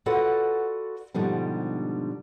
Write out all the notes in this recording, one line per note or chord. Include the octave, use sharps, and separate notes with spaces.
F4 F#4 A4 B4 D5 F#5
G#2 B2 D3 F3 G3